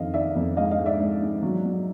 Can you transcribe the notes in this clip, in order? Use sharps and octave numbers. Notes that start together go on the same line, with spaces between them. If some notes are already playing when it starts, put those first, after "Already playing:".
Already playing: F2 D#3 D#5 F5
D#3 D5 E5
F2
G#2 D#5 F5
D#5 F5
G#2
D5 E5
G#2
G#2
F#3
F#3